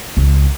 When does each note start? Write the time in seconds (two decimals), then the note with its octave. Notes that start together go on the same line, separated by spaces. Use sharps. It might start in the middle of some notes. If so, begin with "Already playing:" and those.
0.17 C#2